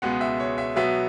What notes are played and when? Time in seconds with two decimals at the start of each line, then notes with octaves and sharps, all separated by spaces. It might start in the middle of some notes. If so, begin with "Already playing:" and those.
0.02 C#2 B2 G#3 B3 F#5
0.21 E5
0.40 C#5
0.58 E5
0.76 B2 F#3 B3 E5